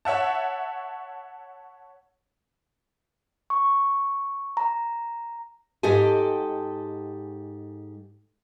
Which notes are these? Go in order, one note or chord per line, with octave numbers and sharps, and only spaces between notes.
C#5 E5 F#5 A5
C#6
A#5
G#2 G4 A4 D#5 G#5